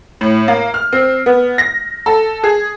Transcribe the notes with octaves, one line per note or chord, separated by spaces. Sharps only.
A2
A#3
F6
C4
B3
A#6
A4
G#4